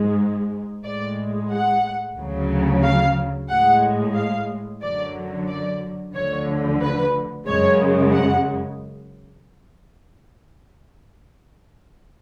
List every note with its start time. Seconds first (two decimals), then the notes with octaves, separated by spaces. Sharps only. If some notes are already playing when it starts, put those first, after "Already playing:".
Already playing: G#2 G#3
0.84 A2 G#3 D5
1.51 F#5
2.17 D2 C#3 F#3
2.83 F5
3.49 A2 G#3 F#5
4.15 F5
4.82 F#2 D3 F#3 D5
5.48 D5
6.14 D2 D3 F3 C#5
6.81 B4
7.47 F#2 C#3 G#3 C#5
8.13 F#5